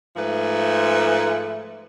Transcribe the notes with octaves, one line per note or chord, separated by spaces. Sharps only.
G#2 F3 A3 B4